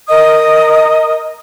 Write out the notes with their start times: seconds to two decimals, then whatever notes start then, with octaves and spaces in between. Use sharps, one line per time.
0.07 A#4 D#5 D#6